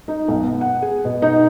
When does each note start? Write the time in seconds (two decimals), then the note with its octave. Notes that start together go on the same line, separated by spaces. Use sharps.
0.08 D#4
0.28 B1
0.43 B3
0.61 F#5
0.82 G#4
1.05 B2
1.22 D#4